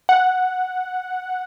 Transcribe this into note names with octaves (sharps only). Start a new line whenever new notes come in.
F#5